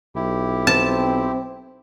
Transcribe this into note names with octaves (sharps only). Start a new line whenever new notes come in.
B1 E4 G4
C4 A5